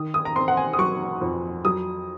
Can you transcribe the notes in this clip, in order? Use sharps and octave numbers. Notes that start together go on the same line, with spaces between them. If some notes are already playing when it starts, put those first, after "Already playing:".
Already playing: D#3 D#6
D#6
A#5
C4 C6
F#5
G#5
D#6
F#3 C#6
F2
F#3 D#6